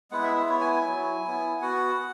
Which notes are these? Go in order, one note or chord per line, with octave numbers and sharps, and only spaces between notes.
G#3 B3 E4 F#5
E5
E5
B3 E4 C#5
G#5
G#5
F#3 E4
B3 E4
B3 F#4 F#5